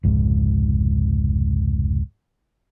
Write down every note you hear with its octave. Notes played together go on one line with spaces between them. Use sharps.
F1 C#2 G#2